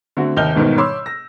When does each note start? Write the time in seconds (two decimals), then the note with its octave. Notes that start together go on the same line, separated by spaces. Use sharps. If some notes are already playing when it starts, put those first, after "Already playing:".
0.17 D3 A3 C4 F#4
0.37 D#2 C3 D#5 F6 G6 G7
0.55 G1 G#2 B2 D#3
0.78 C#5 B5 C6 D6 E6
1.06 A#6